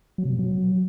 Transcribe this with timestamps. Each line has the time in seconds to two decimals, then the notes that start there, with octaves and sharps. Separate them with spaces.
0.18 F#3
0.25 C3
0.32 B2
0.39 F#3